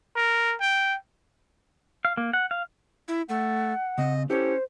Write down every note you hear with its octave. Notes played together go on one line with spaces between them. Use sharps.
A#4
G5
F5
A#3
F#5
F5
E4
A3 F#5
C#3 C4 D#5
C#4 E4 G4 A4 C5